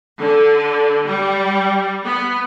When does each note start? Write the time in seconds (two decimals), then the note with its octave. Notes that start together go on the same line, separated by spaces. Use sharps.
0.20 D3
1.07 G3
2.04 B3